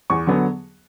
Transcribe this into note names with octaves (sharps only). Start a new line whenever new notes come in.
E2 C#6
D3 F#3 B3